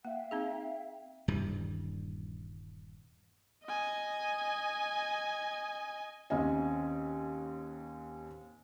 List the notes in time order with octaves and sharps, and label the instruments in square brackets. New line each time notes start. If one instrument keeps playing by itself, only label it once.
[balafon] A#3 [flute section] E5 F5 G5
[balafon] C4 D#4 G#4
[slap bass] D#1 G2 C3 E3
[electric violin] D#5 G#5
[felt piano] D#2 C4 C#4 D#5 G#5